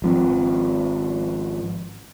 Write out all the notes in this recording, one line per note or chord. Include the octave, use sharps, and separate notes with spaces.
G#1 F3 C4